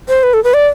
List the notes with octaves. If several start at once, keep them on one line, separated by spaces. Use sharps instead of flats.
C5
B4
A4
B4
D5